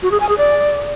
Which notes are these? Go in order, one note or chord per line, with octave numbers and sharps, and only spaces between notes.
F#4
G#4
G#5
G#4
D5